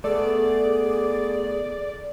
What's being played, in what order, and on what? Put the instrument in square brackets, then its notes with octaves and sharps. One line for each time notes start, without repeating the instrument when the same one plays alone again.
[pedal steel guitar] A3 B3 [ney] G#4 [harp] A4 [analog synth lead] D5